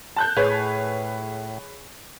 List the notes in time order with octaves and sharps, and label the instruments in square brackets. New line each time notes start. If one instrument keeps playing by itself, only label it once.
[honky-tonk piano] A5 F#6 G6
[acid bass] A2 [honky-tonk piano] G#4 B4 C#5